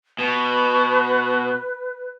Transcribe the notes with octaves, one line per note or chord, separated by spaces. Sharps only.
B2 B4